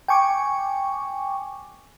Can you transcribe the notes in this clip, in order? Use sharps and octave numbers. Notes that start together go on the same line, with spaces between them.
G5 G#5 C#6 D6